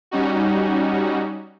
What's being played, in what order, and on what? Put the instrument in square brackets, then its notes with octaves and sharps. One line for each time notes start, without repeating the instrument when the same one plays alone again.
[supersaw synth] G3 C#4 D#4 F#4